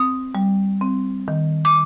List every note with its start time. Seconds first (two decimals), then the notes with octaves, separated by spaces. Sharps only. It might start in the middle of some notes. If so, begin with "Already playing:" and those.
Already playing: C4 D#6
0.35 G3
0.81 C4
1.28 D#3
1.65 D6